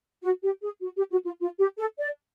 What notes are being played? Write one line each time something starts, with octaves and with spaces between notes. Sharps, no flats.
F#4
G4
G#4
F#4
G4
F#4
F4
F4
G4
A4
D5